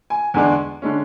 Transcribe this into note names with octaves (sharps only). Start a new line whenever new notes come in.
G#5
E2 D3 G#3 D4 G#5
D3 G#3 C#4